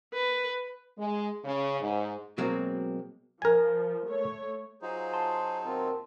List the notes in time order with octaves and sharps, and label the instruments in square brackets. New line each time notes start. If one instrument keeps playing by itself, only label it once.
[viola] B4
[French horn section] G#3
C#3
G#2
[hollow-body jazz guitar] B2 F#3 G#3 A#3 C4
[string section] F3 [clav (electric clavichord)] A#4 G#5
[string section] A3 C#5
[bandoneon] F#3 D#4 [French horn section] F4 [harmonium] G#4 C5
[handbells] A5 C6
[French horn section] D#2 B2 A#4 [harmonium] C4 F4